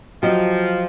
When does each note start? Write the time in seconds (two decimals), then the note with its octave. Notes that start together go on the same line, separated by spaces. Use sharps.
0.23 F3 F#3 G4 D#5